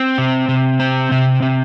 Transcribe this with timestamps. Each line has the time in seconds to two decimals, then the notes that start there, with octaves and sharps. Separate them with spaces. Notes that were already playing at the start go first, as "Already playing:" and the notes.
Already playing: C4
0.18 C3
0.49 C3
0.80 C4
1.12 C3
1.42 C3